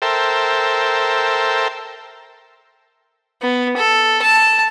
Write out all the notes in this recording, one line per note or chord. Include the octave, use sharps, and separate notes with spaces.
A4 A#4 C5 E5 G5
B3
A4
A5